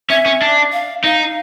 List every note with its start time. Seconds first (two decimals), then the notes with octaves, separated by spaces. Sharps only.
0.10 C#4 E5
0.26 C#4
0.41 D4
0.72 F5
1.04 D#4 F5